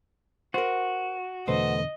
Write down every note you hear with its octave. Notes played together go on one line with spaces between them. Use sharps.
F#4 A#4 C5
E2 B2 D3 A3 B4 C5 D#5